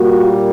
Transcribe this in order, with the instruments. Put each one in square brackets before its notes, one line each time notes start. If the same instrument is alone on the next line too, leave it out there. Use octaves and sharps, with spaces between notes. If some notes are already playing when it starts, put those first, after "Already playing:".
Already playing: [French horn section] A#2 G3 A#3 F#4